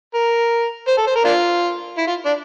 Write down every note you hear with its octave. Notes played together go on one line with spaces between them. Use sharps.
A#4
C5
A4
C5
A#4
A#3 D4 F4
E4
F4
D4